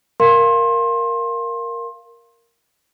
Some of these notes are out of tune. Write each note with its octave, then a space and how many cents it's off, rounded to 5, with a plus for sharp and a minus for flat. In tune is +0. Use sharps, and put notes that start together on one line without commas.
A#4 +0 F5 -10 C6 +25